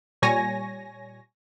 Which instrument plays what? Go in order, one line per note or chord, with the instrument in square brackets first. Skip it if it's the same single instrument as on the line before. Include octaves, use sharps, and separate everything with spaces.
[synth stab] A#2 G3 C#5 G#5 A#6